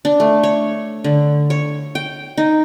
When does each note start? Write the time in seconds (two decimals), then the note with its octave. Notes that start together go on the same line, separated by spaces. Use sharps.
0.05 D4
0.20 A3
0.43 C#5
1.04 D3
1.50 C#5
1.95 G5
2.37 D#4